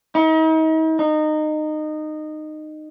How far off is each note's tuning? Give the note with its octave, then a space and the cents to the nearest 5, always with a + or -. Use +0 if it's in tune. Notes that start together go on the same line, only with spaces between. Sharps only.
D#4 +40
D#4 -20